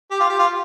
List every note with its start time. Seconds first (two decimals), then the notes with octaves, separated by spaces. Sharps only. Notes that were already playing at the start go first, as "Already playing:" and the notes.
0.11 G4
0.20 F4
0.30 G4
0.39 F4